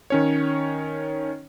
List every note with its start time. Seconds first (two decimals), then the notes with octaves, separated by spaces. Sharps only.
0.10 D#3 C#4 C#5